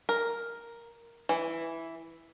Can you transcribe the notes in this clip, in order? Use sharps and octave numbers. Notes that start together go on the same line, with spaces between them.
A#4
E3